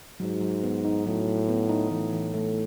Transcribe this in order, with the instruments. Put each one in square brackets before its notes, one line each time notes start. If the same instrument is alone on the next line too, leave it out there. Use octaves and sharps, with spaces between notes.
[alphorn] G#2 [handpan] F#3
[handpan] F#3
B3
D#4
[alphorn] A2 [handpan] F#3
[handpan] F#3
B3
D#4
[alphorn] A2 [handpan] E3
[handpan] E3
A3